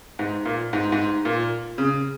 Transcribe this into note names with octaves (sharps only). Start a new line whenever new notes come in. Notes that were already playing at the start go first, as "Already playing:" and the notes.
G#2
A#2
G#2
G#2
A#2
C#3